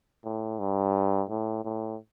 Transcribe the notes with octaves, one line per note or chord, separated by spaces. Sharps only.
A2
G2
A2
A2